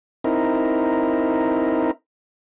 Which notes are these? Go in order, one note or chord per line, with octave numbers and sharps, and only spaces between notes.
C4 D#4 E4 A#4